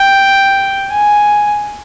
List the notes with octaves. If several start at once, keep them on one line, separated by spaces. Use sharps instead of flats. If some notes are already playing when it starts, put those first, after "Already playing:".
Already playing: G5
G#5